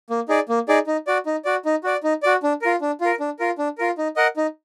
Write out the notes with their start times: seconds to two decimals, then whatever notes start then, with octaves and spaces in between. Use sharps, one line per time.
0.10 A#3
0.29 D#4 G#4 D5
0.49 A#3
0.69 D#4 G#4 D5
0.87 D#4
1.07 F#4 D5
1.26 D#4
1.45 F#4 D5
1.65 D#4
1.84 F#4 D5
2.03 D#4
2.23 F#4 D5
2.43 D4
2.62 F4 A#4
2.81 D4
3.01 F4 A#4
3.20 D4
3.39 F4 A#4
3.58 D4
3.78 F4 A#4
3.98 D#4
4.16 A#4 D#5 F#5
4.37 D#4